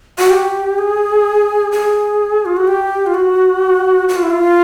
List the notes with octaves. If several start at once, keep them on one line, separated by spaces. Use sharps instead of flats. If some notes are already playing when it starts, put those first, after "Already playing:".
F#4
G4
G#4
G#4
F4
F#4
G4
F4
F#4
F#4
F4
E4
F4